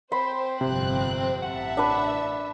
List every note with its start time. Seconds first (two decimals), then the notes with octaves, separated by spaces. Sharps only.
0.12 C4 C5 B5 C6
0.61 G1 F2 C3 F#6
1.42 A1 E5 F#5 A5
1.77 D4 B4